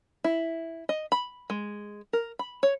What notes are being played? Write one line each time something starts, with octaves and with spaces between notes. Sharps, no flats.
E4
D#5
B5
G#3
A#4
B5
C#5